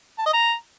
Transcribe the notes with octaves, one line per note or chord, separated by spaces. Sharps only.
A5
D#5
A#5